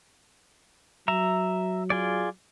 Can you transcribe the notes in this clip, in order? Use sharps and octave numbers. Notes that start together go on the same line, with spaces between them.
F#3 E5 A#5
F4 G#4 D5